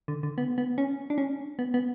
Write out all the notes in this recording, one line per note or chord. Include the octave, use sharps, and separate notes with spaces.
D3
D3
B3
B3
C#4
D4
C#4
B3
B3